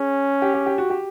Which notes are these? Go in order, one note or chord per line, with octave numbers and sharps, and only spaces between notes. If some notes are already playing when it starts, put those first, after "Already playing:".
Already playing: C#4 G#4
G4
G4
G4
F#4
G4